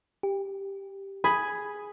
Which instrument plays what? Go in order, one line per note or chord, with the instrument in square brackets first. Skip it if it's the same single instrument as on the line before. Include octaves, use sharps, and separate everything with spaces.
[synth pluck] G4
[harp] G#4 [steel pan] B5